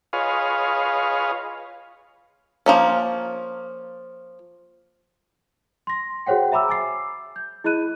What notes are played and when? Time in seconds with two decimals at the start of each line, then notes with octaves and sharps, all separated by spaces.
0.13 F4 G#4 B4 C#5 D#5 F5
2.66 F3 A#3 C#4
5.87 C6 A#6
6.26 F#4 G#4 C5 C#5 F#5 G5
6.52 E5 A#5 B5 D6 E6
6.69 G#5 D6 A6 C7
7.36 G6
7.64 E4 G#4 D#5 B5 F#6 D#7